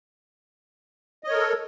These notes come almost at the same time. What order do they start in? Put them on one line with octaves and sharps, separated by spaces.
D#5 C#5 A#4 A4